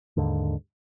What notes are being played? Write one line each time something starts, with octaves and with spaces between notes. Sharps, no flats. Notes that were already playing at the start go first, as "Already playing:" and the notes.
D#2 G#2 D3